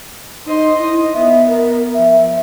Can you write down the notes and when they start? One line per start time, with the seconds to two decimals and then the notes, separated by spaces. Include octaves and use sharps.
0.46 D#4 C5 D#5 C6
0.79 E4 D#5
1.14 B3 E5
1.48 A#4
1.94 F3 E5